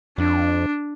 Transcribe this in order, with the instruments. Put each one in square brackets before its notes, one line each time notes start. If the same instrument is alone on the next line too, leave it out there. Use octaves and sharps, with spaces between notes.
[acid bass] F2 [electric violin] D4